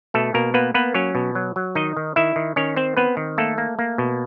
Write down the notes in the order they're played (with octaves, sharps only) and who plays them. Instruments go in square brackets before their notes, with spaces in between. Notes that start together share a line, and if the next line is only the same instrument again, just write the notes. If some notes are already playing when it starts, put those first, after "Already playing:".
[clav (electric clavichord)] B2 A3 A4
B2 A#3 A#4
A#3 B3 B4
A#3 B3 B4
F#3 C#4 C#5
B2
F#3
F#3
D#3 D#4 D#5
D#3
D#3 E4 E5
D#3
D#3 C#4 C#5
C4 C5
B3 C4 B4
D#3
A3 A#3 A4
A#3
A#3
B2